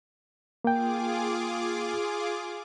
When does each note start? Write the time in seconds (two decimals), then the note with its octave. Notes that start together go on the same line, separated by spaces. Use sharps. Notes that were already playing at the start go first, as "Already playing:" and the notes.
0.65 A#3 F4 G#4 G5 D6